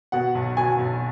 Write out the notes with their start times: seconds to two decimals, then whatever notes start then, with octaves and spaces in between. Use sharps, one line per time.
0.12 B2 F#5
0.35 B1
0.57 B2 G#5
0.78 B1